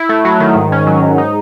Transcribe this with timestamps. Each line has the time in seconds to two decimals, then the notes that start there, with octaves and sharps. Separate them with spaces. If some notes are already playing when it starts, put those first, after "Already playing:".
Already playing: E4
0.09 A3
0.25 F#3
0.40 D#3
0.55 G#2
0.72 C#4
0.87 F#3
1.03 G#2
1.18 D#4